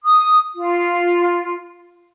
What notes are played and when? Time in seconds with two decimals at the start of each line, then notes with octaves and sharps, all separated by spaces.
0.04 D#6
0.55 F4